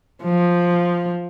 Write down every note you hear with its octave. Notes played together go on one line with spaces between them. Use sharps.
F3